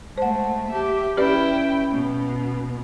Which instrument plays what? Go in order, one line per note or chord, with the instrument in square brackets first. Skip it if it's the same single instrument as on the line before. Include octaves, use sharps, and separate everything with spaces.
[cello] G#3 A3 [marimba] C5 F#5 [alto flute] A5
[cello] G4 E5
[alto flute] C#4 [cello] E4 G5 [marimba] G4 B4 D5
[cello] B2